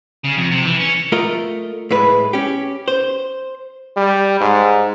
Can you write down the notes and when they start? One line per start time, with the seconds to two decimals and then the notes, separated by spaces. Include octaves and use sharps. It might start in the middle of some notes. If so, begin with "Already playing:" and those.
0.24 C#3
0.37 F2
0.51 C3
0.65 E3
0.79 C#4
1.12 A3 F4 A#4 D#5
1.91 A2 G#3 B4
2.33 C#4 G4
2.88 C5
3.97 G3
4.40 G#2